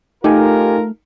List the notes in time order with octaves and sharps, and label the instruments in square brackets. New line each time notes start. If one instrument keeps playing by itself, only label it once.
[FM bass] A3 [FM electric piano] D#4 [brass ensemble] F4 A4 A#4 [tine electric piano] G4 G#5